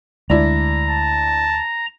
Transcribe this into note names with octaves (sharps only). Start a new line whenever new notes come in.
D2 G#3 D4 E4 A#5
A5